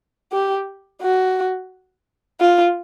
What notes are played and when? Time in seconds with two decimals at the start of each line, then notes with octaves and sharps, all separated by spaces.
0.32 G4
1.02 F#4
2.41 F4